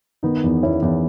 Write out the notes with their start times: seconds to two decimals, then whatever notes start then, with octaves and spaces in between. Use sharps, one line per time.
0.23 D#3 B3 D#4
0.44 E2
0.62 E2 C#4 E4
0.82 E2